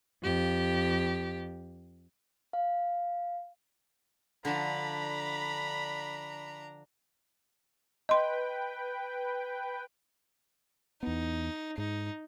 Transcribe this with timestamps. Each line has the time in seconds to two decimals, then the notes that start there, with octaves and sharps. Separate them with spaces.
0.23 F2 G4
2.53 F5
4.45 D3 F3 D4 A#5 B5
8.09 B4 D#5 G5 C6
11.03 E2 B3 D#4
11.78 G#2 D#4